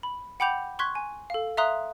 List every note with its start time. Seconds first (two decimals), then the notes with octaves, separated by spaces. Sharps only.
0.03 B5
0.40 F#5 G5 B5 D6 G6 F7
0.79 C6 C#6 F#6 G#6 B6
0.95 G#5
1.30 A4 F5
1.57 E5 F5 A#5 C6 D#6 F#6